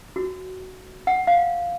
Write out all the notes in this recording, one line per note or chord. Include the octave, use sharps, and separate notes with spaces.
F#4
F#5
F5